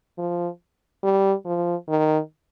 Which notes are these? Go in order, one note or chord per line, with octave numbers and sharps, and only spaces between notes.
F3
G3
F3
D#3